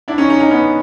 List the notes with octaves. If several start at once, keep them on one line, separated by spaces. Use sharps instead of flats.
D4 E4
C#4 D#4
C#4 D#4
C#4 D#4
B3 C#4